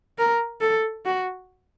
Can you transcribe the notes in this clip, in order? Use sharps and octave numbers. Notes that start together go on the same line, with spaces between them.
A#4
A4
F#4